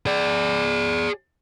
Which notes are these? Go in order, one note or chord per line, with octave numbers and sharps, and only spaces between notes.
G#4 D5